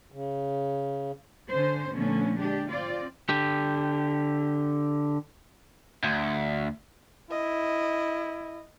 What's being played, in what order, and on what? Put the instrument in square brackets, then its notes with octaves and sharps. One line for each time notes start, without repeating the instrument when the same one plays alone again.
[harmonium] C#3
[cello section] D3 C#4 C5
A#2 D3 F3 A3 B3 C#4
G#3 D4 G4
C4 F4 D5
[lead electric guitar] D3 G4
[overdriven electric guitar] D2
[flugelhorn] E4 [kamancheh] D#5